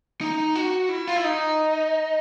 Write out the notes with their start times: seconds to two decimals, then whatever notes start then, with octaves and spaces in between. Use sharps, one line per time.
0.21 D#4
0.56 F#4
0.89 E4
1.08 F4
1.16 E4
1.24 D#4